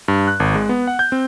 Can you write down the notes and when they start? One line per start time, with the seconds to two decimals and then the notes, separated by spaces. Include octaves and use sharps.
0.08 G2
0.27 F#6
0.40 G#1
0.55 G#3
0.69 B3
0.87 F#5
0.99 G6
1.12 C4